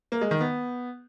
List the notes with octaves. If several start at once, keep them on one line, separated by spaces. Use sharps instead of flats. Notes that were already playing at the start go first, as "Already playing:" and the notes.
A#3
G#3
D#3
B3